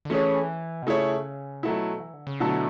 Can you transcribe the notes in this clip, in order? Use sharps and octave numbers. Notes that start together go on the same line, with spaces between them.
D3
E3 A3 C#4 G#4 C#5
B2
C#3 A3 E4 G#4 C#5
B2 F#3 A3 E4
E3
D3
C#3
B2 D3 F#3 A3 E4 A4